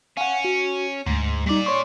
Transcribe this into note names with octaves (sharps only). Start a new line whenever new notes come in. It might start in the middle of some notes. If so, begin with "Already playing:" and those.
C#4 F5 F#5
F#4
D2 G#2
A#2 G3 D#4 D5
C#5 C6 C#6